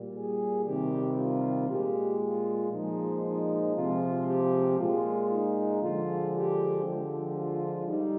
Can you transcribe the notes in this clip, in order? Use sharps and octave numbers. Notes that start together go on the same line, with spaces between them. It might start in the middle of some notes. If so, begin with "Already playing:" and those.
Already playing: A#2 G3
G#4
C3 D#3 G3 G4
F4
A#2 G#3 G4
F4
A#2 F3 G#3 D#4
D#4
C3 F3 G#3 F4
G4
A#2 G#3 F4
D#4
D3 F3 G#3 F4
G4
D3 F3 G#3 G4
F4
G3 D#4